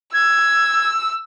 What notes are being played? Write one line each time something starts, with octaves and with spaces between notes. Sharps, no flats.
E6 G#6